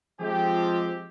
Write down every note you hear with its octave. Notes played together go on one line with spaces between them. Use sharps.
F3 G#3 C4 G4